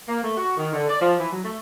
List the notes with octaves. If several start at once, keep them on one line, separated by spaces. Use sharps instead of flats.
A#3
A3
F#4
D#3
D3
D5
F3
E3
F#3
A3